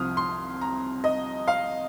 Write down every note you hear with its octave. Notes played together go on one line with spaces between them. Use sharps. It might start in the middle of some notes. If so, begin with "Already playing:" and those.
Already playing: C2 C3 F3 D#6 F6
C6
A#5
D#5
F5